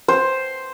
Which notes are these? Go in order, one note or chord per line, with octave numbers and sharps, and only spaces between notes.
C5